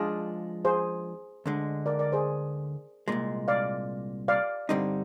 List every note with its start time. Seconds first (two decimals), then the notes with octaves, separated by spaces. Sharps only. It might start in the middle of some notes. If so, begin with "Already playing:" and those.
Already playing: F3 G#3 D4 F4 G#4
0.65 G#4 C5
1.46 D2 D3 G#3
1.86 A#4 D5
1.99 A#4 D5
2.12 G#4 C5
3.08 C2 A#2 G#3
3.48 D5 F5
4.28 D5 F5
4.69 G2 D3 G3 C4 D#4